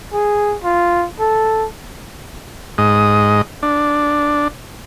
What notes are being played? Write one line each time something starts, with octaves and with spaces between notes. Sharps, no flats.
G#4
F4
A4
G#2 D#5
D4